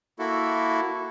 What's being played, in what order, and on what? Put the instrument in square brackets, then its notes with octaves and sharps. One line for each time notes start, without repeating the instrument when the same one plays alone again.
[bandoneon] A#3 E4 F#4 A4